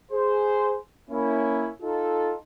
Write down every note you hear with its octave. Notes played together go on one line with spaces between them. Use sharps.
G#4 C5
A#3 C#4 E4
D#4 F4 A4